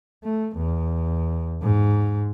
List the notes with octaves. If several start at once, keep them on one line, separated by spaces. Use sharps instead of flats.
A3
E2
G#2